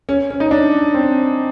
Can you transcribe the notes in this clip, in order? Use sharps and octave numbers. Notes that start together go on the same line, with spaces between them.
C#4
C#4
D#4
D4
C4